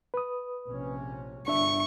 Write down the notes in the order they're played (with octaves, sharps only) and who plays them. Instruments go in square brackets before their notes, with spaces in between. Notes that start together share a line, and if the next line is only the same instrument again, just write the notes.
[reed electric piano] B4 D#6
[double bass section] A#1 C3 C#4
[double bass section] G1 [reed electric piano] D4 E5 [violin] C#6